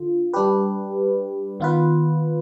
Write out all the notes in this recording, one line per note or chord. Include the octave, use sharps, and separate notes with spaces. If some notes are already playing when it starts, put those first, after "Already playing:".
Already playing: D3 F4
G3 D4 G4 B4
D#3 B3 F4 B4